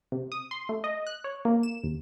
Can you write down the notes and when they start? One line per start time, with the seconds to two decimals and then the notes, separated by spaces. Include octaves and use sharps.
0.12 C3
0.32 D#6
0.51 C6
0.69 A3
0.84 D#5
1.07 F#6
1.24 C#5
1.45 A#3
1.63 E7
1.84 D#2